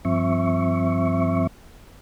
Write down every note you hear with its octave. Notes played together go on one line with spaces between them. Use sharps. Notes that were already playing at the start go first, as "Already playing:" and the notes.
G2 F3 C4 E5 C#6